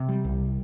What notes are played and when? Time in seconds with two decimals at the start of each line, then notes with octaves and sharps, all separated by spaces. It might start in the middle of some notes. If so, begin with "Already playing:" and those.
Already playing: C3
0.09 G3
0.25 C2